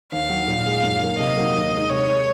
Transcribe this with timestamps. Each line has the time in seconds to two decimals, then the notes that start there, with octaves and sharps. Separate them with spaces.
0.12 D#2 F5
0.30 D#3 F#3
0.48 A#2
0.66 G#3 D#4 G#4
0.83 F#2
1.01 D#3 A#3
1.18 C3 D#5
1.37 F#3 A#3 D#4 F#4
1.54 D#2
1.72 D#3 G#3 D#4
1.90 C3 C#5
2.08 D#3 G#3